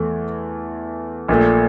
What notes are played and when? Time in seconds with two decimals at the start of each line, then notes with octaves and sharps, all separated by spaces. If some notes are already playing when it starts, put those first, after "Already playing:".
Already playing: E2 E3 A3
1.28 A#1 A#2 A3